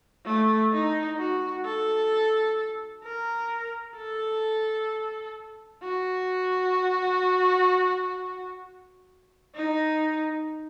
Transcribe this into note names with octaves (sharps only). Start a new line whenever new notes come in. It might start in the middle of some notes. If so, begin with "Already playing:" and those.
A3
D#4
F#4
A4
A#4
A4
F#4
D#4